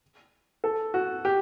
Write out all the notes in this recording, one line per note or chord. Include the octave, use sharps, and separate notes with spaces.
A4
F#4
G4